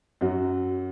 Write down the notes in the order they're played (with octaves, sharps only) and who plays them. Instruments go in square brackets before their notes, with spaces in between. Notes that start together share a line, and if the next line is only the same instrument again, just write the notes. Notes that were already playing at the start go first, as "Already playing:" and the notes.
[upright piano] F#2 F#3 F#4